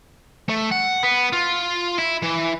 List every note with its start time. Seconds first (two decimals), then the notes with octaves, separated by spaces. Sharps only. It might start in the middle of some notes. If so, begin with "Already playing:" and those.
0.49 A3
0.71 F#5
1.03 B3
1.33 F4
1.98 E4
2.23 E3